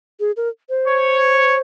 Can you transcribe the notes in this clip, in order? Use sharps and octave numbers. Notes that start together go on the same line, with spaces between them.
G#4
A#4
C5
C#5